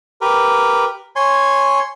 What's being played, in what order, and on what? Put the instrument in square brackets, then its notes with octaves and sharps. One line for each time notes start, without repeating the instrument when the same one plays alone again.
[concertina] G4 A#4 B4
C#5 G#5 C6